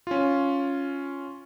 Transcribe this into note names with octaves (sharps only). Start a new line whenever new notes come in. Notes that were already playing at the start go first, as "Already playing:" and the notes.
C#4 F4